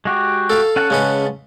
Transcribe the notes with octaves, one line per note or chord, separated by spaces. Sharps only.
G#3 F#4 G4
A4 F5
C#4 F#5 A5
C#3 G#3 B4